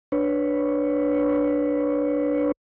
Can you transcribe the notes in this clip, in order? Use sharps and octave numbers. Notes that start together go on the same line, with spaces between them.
D4 B4 C#5